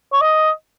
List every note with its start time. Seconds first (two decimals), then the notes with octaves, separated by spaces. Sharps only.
0.13 C#5
0.21 D#5